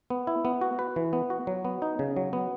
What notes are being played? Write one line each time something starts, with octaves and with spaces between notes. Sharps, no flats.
B3
E4
B3
F#4
B4
E3
B3
F#4
F#3
B3
D#4
C#3
F#3
B3